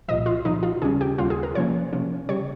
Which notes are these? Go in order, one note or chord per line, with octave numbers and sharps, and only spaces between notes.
C2 A#2 F3 D#5
F4
C2 A#2 F3 D#4
F4
D#2 C#3 G3 C#4 G#4
G4
D#2 C#3 G3 C#4 F4
G#4
A#4
C3 F3 A#3 C#4 C#5
C3 F3 A#3 C#4
C#3 G3 C#5